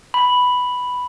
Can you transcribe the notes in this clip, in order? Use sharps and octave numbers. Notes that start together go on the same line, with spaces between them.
B5